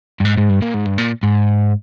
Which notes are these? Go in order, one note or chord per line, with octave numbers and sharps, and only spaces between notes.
G2
G#2
G#2
G2
A#2
G#2
G2
A#2
G#2